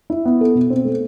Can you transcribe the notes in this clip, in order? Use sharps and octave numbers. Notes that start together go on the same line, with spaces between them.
E4
B3
A4
B2
C4
A3